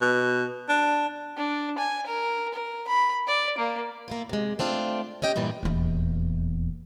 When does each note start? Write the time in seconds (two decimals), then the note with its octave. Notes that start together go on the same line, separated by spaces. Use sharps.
0.01 B2
0.69 D4
1.37 D4
1.78 G#5
2.07 A#4
2.54 A#4
2.88 B5
3.27 D5
3.58 A#3
4.08 A#3 E4 F4
4.29 C3 G#3
4.59 A3 C4 D4 F4
5.22 C#4 G4 D#5 G5
5.36 G2 A#2 E3 G3
5.63 D#1 E2